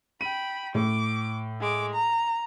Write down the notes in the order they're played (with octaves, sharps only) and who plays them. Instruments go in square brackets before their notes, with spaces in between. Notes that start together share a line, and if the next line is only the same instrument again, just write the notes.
[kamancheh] G5 B5 [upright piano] D#7
[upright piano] A2 [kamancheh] D6
[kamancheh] G#3 D6
A#5